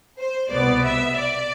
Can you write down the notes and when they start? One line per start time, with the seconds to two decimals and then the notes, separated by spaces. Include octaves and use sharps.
0.18 C5
0.51 C2 B2 B3 D5
0.84 E5
1.16 D5